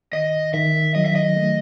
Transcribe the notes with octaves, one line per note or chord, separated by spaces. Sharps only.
D#3 D#5
D#3 E5
F#3 D#5
E5
D#5
A3